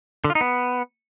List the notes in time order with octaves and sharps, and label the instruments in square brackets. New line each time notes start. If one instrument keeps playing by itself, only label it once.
[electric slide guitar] D3
F4
D#4
B3